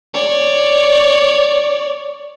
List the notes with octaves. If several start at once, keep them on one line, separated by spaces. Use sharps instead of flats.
C#5 D5